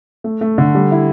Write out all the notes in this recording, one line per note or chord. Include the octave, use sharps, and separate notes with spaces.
A3
A3
D3
G3
E4